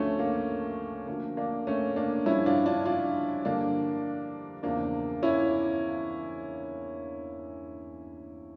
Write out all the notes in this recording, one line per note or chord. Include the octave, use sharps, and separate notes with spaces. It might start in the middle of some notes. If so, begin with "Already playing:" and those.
Already playing: D2 D3 F3 A3 C#4
A#3
D2 D3 F3 A#3
A#3 D4
A3 C#4
A#3 D4
G2 F3 C#4 E4
D4 F4
D4 F4
D4 F4
G2 D3 F3 A#3 D4
E2 C#3 F3 A#3 D4
C#4 E4